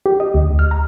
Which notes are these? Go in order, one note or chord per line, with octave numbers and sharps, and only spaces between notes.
G4
D#5
D2
F6
A#5